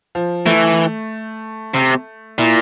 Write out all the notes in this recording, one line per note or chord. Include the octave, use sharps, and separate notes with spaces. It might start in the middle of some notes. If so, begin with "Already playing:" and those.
F3
E3 A3
C3
A#2 E4